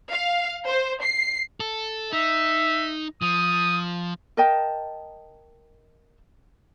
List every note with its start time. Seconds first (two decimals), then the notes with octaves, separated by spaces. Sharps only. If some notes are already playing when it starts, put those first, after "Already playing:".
0.11 F5
0.69 C5
1.02 C7
1.60 A4
2.12 D#4 E5
3.22 F3 D#6
4.37 A#4 D#5 G5 A5